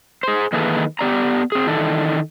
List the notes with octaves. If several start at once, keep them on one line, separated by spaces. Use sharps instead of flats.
G#4 C5
D#3 E3 A#3 G#4 A4 B4
B3 G4 D5 A#5
C4 G#4
D#3 E3 D4 A4